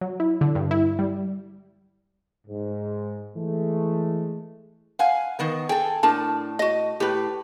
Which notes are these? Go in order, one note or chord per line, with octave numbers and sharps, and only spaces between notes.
F#3
E4
D3
G2
E4
G3
G#2
E3 G#3 A3
F5 F#5 G#5
D#3 B3 A#4
G#4 A4 G5
A2 D4 A#4 A5
F#4 D#5
A2 G4 B4